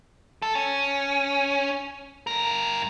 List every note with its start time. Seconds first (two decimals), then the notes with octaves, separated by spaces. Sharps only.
0.42 A4
0.55 C#4
2.27 G2 A#4